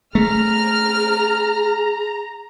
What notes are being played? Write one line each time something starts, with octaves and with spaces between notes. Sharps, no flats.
A3 G#4 A#5 F6